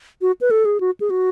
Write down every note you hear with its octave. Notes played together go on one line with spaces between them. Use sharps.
F#4
B4
A4
G#4
F#4
G#4
F#4